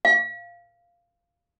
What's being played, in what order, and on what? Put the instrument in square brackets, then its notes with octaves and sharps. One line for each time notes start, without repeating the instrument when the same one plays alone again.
[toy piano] F5